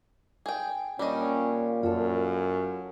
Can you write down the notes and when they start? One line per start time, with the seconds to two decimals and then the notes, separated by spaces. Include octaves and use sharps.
0.46 G#4 G5
0.99 A#2 G3 C#4 D4 D#5
1.83 F#2 F4 A4